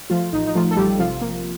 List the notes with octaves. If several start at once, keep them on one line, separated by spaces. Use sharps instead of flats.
F3 A3 F4
A1 D#4
D#4
F3 A3 F4
A4
A1 G3 G4
C3 F3 F4
A#3